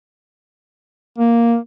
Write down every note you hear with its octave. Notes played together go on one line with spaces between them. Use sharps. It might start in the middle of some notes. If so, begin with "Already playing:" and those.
A#3